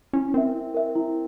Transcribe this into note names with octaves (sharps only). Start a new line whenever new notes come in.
C#4 E4
C4 A#4 E5
E4
A#4 E5
E4